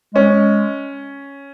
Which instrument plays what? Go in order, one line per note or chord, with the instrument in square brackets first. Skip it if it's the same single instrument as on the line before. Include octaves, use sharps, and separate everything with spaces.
[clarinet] G#3 [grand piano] C#4